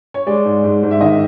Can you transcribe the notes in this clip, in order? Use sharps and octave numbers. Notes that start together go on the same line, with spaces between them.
C#5
G#3 D5
G#2
G#2
G#2
E5
D#3 D#5